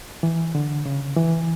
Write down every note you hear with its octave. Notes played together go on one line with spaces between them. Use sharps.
E3
D3
C#3
E3